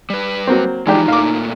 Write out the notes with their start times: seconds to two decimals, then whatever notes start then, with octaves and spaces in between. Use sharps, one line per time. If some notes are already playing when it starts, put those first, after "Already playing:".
0.10 G3 B4
0.47 F#3 A#3 C4
0.87 E3 F3 G#3 D4 D#4 G4
1.08 A#2 A3 A#3 F5 D6